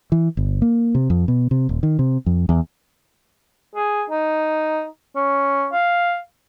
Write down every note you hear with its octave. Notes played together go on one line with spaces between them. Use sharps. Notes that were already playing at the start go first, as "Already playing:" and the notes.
E3
G1
A#3
C3
F2
B2
C3
D#1
D#3
C3
F2
E2
G#4
D#4
C#4
F5